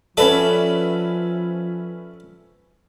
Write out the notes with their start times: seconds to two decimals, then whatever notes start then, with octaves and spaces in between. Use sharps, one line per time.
0.17 F3 C#4 F#4 A4 B4 D5 E5